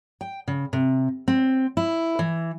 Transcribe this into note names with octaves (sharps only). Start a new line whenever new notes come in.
G5
C#3
C3
C4
E4
E3